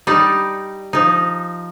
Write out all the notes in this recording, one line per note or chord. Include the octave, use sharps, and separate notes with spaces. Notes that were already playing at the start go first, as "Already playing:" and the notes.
G3 D#4 D5
F3 D#4